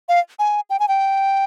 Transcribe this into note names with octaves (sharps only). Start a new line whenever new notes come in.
F5
G#5
G5
G#5
G5